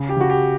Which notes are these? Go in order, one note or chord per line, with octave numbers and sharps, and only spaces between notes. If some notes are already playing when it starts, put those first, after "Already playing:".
Already playing: C#3
G4
C#3 F#4
G4